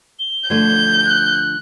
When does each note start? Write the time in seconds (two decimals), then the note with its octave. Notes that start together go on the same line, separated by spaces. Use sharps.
0.19 G7
0.50 D3 F3 A3 G6 G#6
1.05 F#6